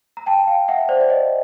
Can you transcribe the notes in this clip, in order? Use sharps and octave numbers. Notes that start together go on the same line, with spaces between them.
A#5
G5 A5
F5 G5
E5 F#5
C5 D5
D5
C#5 D#5